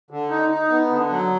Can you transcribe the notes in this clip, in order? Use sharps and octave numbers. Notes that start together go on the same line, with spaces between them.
D3
D#4
D#4
B3
D3
F#3